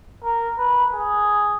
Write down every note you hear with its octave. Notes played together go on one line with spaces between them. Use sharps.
A#4
B4
G#4